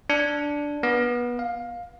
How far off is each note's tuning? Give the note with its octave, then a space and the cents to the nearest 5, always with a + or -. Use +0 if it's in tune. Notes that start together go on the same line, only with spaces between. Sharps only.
D4 -5
B3 -25
F5 +15